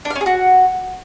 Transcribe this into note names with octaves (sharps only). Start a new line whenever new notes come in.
D4
F5
C#4
G#4
F#4